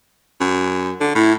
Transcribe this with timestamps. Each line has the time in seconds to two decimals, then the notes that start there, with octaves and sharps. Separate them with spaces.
0.40 F#2
1.00 D3
1.15 A2 E4